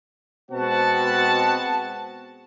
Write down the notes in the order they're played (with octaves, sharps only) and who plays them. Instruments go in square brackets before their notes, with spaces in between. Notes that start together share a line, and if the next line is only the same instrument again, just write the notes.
[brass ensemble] B2 G#3 C4 F#4 F#5 A5